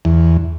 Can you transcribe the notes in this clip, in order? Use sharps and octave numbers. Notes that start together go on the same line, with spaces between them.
E2